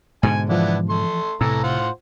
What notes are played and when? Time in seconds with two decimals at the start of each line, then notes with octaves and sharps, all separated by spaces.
0.23 G#2 B2 D3 G#5
0.49 E3 F3 B3 D4 E4
0.90 A3 C6
1.41 C2 A2 C3 E3 A3 A#5 E6
1.64 F4 C5 F#5